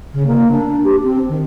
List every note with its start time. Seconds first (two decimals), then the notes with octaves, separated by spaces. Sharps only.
0.13 C#3
0.26 A#3
0.51 D4
0.83 G4
1.03 C4
1.28 D#3